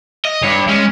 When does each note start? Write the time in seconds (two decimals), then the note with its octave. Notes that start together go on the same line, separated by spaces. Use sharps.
0.25 D#5
0.44 G2 C#5
0.69 G#3 C#4